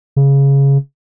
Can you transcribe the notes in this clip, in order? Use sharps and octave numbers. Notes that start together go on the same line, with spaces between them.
C#3